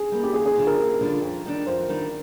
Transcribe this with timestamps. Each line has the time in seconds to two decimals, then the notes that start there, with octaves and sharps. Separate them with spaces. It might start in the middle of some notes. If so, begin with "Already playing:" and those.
Already playing: G#4
0.12 G3 A#3
0.23 G4
0.33 D#2 G#4
0.45 G#4
0.55 D3 G3 D4 F4
0.67 A#4
0.79 D#2
1.01 D3 G3 D4 F4
1.22 F2
1.45 D#3 G3 D4
1.67 F2 C5
1.89 D#3 G3 D4